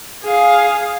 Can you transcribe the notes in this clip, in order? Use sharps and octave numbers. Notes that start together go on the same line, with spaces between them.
G#4 F5